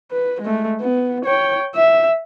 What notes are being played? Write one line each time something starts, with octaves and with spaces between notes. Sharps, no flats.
B4
G#3 A3
B3
C#5 G5
E5